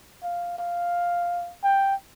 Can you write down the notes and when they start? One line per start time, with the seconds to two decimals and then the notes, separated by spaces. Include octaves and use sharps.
0.23 F5
0.59 F5
1.64 G5